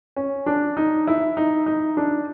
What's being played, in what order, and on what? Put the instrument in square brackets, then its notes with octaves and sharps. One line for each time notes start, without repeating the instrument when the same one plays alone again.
[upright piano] C#4
D4
D#4
E4
D#4
D#4
D4